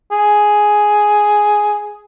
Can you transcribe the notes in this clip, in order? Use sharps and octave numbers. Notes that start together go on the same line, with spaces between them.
G#4